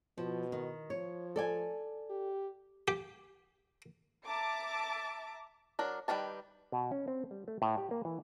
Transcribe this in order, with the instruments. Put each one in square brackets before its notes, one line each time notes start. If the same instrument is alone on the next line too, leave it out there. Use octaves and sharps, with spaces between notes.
[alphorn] B2 [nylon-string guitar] F3
[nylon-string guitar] D#3
[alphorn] F3 [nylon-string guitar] C#5
[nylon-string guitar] A4 D5 G#5
[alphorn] G4
[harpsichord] G4
[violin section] E5 A5 A#5 D6 D7
[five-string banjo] F#3 D4 A#4
D#3 G3 F4 B4 A5
[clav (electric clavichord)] B2
C#4
C4
G3
A3
A2
G4
A#3
E3